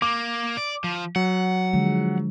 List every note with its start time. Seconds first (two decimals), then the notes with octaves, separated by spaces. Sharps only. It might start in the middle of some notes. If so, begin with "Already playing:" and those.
0.02 A#3 D6
0.57 D5
0.84 F3
1.16 F#3 F#5
1.73 D3 F3 G#3